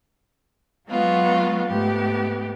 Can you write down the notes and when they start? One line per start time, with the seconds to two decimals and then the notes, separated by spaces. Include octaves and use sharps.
0.88 F#3 G#3 B3 F4 F#4
1.68 G#2 A3 B3 G4